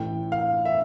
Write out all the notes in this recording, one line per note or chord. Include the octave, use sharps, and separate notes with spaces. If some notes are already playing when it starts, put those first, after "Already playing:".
Already playing: A1 A2 E3 G5
F5
E5